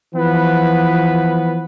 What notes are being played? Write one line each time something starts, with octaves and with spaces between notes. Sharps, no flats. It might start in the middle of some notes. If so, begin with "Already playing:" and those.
E3 F3 B3 B4